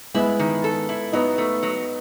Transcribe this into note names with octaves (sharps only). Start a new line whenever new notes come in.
G#3 B3 E4
D#3
A4
E4
F#3 B3 D#4
A3
F#3